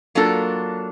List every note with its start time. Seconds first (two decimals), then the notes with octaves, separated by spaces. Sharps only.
0.15 F#3 A#3 D4 F4 A4